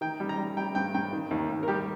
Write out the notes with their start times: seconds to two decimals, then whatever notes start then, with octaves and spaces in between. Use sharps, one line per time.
0.01 D#3 G5
0.20 G3
0.29 A#5
0.38 G3
0.57 G3 G5
0.75 G2 G5
0.94 G2 G5
1.13 D#3
1.31 D#2
1.50 D#2
1.63 A#4
1.68 G3 G4